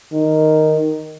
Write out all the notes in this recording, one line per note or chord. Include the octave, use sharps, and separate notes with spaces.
D#3